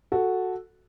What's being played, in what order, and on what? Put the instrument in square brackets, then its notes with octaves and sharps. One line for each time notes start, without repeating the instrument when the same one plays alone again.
[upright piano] F#4 A4